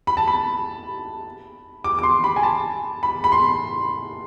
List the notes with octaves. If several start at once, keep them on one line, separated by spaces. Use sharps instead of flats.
B5
A5
B5
D6
D6
C6
B5
G#5
A5
B5
B5
C6